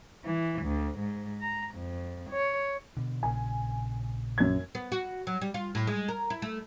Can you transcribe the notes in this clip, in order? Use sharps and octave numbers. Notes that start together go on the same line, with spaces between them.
E3
D2
G#2
A#5
F2
C#5
B2 D3
A#1 A#2 C#3 G#5
F#2 G#6
B3
F#4
F#3
G3
F4
A2
G#3
A#4
E4
A3